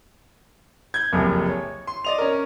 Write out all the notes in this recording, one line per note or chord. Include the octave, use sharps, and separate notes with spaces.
G6 G#6
F#1 C2 F2
C#5
C6
D5 D#5 F7
C#4 A#4